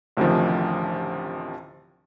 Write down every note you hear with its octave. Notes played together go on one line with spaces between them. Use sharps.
A1 D2 C3 D#3 F3